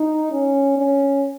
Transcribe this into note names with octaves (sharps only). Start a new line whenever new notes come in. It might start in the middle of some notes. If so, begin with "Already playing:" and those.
Already playing: D#4
C#4
C#4